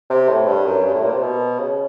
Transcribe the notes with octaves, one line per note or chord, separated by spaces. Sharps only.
C3
A2
G2
F#2
G2
A2
A#2
C3
B2
C#3